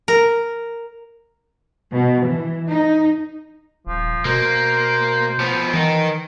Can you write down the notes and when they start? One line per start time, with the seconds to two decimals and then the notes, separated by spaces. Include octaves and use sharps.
0.08 A#4
1.93 B2
2.26 E3
2.69 D#4
3.87 D#1 F3
4.25 B2 A#3 C5
5.40 F3 B3
5.74 D#3 E3 D#4